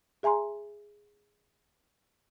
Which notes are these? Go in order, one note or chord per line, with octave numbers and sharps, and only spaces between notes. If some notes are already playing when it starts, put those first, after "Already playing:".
G#4 E5 G#5 A#5 C6